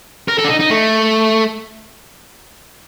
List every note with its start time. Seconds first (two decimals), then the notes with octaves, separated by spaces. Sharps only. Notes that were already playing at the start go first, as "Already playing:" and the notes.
0.28 A#4
0.38 A4
0.44 D4
0.49 D#4
0.60 D#4
0.70 A3